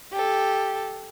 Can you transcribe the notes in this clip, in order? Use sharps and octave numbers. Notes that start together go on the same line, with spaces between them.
G4 A4